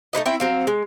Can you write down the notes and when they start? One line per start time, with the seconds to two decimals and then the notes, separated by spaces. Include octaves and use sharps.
0.13 A3 D#4 B4 D#5
0.26 C4 E4 G5
0.40 F#3 C4 F5
0.67 G#3